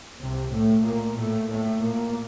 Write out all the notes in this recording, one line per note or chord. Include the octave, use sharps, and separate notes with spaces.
C2 C3
A2 A3
A#2 A#3
A2 A3
A2 A3
A#2 A#3